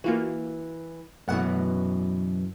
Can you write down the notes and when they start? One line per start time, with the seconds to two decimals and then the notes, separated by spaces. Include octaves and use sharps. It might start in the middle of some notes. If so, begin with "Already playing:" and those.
0.04 E3 A#3 F4 F#4
1.28 F#2 B2 E3 A3 F#5